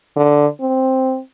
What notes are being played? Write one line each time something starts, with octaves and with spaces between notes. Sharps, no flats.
D3
C4